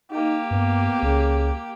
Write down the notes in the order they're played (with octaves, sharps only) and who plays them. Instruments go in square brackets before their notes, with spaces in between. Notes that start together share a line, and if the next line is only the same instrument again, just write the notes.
[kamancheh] A#3 G4 [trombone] D#4
[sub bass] G2 [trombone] B3
[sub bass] C#2 [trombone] C#3